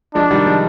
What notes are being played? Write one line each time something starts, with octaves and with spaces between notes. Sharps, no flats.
F3 G#3 D4
D#3 G3
F3 G#3